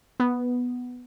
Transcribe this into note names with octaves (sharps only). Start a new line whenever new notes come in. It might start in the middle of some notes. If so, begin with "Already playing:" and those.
B3